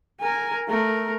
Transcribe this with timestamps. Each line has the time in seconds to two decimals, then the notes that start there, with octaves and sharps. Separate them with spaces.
0.21 A#4 G#5
0.68 A3 A#4